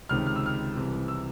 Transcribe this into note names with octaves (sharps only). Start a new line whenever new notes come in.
C#2 C3 D#3 F6
F6
E6
F6
C2 C3 E3
E6